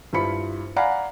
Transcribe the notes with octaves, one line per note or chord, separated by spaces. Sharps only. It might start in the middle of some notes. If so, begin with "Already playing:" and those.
G2 E4 F4 C5 B5 C#7
D5 F5 F#5 G#5 A#5 B5